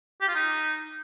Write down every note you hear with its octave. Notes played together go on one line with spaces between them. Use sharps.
G4
F4
D#4